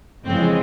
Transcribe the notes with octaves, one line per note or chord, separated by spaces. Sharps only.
F2 C#3 E3 G#3 C4